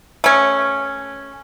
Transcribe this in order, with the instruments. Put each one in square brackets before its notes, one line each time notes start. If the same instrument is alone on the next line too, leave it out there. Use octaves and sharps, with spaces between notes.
[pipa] A3 C#4